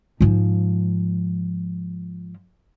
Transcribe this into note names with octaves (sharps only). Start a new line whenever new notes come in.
G#2 F3